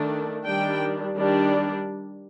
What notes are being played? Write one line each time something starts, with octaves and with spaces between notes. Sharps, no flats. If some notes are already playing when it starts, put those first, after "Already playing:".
Already playing: D#3 A3 D4
D#3 G3 D4 G5
D#3 G3 D4